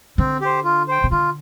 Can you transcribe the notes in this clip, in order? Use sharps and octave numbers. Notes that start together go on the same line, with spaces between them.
D3 C4
G4 C5
F4
C5 G5
C3
D3 F4